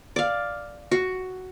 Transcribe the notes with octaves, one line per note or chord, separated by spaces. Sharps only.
D5 F5
F#4